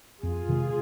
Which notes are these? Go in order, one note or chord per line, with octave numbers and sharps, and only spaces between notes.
F2 F4 G#4
C3 D#3 G#3